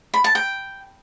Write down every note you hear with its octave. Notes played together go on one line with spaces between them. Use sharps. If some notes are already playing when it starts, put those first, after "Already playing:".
B5
A5
G5